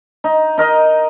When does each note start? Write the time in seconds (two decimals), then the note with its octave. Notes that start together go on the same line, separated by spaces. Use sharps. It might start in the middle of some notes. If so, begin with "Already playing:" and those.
0.24 D#4
0.58 D#4 A#4 D#5